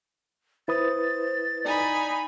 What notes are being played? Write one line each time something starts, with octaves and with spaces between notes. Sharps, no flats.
E4 B4 C5 D#6 A6
D#4 D5 G#5 B5